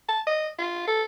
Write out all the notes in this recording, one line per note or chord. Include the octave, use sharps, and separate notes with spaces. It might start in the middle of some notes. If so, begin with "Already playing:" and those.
A5
D#5
F4
A4